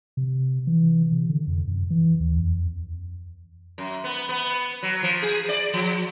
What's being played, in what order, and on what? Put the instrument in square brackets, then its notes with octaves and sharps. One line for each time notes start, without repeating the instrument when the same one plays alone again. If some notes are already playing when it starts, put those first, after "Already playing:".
[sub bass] C3
E3
C3
D3
F2
F#2
E3
D#2
F2
[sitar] F#2
B3
B3
F#3
F3
G#4
D5
F3